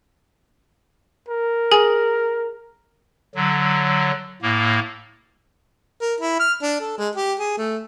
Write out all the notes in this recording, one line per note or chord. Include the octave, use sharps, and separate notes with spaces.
A#4
G#4 G#5
D3 F#3
A2 A#3
A#4
E4
F6
D4
A4
G#3
G4
G#4
A3